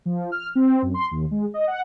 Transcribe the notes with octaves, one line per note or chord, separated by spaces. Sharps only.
F3
F6
C4
F#2
C6
D#2
G#3
D#5
F#5